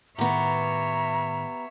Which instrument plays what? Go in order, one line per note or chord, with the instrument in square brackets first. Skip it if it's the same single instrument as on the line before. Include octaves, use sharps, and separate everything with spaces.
[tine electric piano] A2 D#3 [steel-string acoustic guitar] B3 G4 [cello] C#5 E5 [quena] A#5